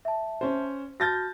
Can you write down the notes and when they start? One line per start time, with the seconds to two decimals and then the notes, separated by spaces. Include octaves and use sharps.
0.05 E5 A5
0.41 C#4 C5
1.00 F#4 A5 F6 G6 A6 A#6